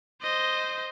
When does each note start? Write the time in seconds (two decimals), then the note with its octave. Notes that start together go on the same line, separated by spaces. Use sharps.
0.22 C5 D#5